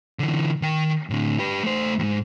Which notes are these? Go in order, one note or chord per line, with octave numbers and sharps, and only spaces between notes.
D3 E3
D#3 G5
A2 D3
G4 B4
A3 C5
D#2 G#2